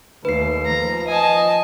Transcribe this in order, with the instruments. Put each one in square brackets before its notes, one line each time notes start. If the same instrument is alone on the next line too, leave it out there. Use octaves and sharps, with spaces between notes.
[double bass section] D#2 A3 [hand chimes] B4 C7
[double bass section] F3 [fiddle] A#5
[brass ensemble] D#5 [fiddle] G#5 A5